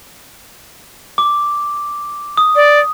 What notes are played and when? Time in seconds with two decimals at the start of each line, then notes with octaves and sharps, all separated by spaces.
1.18 D6
2.37 D#6
2.56 D5